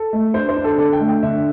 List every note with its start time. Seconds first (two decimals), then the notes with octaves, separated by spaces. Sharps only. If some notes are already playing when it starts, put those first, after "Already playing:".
Already playing: A4
0.13 A3
0.34 D4 C5
0.49 C5
0.56 D4
0.64 A4
0.78 D3 A4
0.93 G5
1.00 A3
1.08 G5
1.23 D3 E5